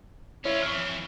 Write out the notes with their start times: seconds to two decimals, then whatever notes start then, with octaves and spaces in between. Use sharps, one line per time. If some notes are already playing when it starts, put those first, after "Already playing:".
0.45 C#4 E4 F4 C#5
0.62 F2 E3 C#6 F6